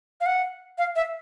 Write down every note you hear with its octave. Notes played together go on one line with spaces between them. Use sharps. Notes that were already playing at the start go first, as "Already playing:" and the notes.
F5
F#5
F5
E5